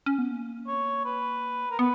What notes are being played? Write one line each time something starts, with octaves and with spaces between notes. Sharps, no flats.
C#4
B3
A#3
C#5
B4
A#4
B3 B4